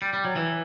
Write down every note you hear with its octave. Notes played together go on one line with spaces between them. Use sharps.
G3
G3
F#3
E3